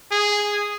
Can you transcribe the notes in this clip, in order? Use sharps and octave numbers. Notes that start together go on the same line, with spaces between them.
G#4